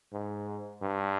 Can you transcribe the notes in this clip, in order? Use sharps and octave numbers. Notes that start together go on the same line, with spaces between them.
G#2
G2